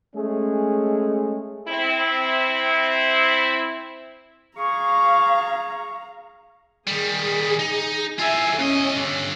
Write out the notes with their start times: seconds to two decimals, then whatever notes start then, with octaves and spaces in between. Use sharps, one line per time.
0.15 G#3 A3 C#4 G#4
1.68 C4 E4
4.57 G#4 F5 A#5 C#6
6.87 D#3 G3 G#4
7.59 D#4
8.19 E3 F4 E5 G#5
8.59 E2 C#4 D#5
8.95 G2 D3